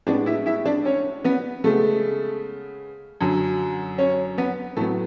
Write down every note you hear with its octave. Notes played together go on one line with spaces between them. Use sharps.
A2 G#3 B3 D4 D5
E4 E5
E4 E5
D4 D5
C#4 C#5
B3 B4
C#3 G#3 A3 B3 A4
F#2 D3 F#3
C#4 C#5
B3 B4
A2 F#3 A3 B3 A4